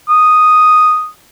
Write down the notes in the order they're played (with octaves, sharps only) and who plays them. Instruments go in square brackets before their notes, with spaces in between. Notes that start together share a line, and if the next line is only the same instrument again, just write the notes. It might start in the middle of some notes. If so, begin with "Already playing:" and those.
[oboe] D#6